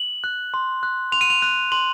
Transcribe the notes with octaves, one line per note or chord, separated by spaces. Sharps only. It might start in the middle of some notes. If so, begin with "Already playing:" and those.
Already playing: F#7
F#6
C6
F#6
C6 F7
D#7
F7
F#6
C6 F#7